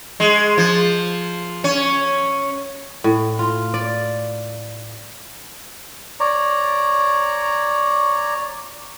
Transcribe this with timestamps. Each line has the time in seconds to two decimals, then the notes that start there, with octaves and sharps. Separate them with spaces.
0.20 G#3
0.58 F3
1.64 C#4
3.04 A2
3.39 F4
3.74 D5
6.20 C#5 D5 A#5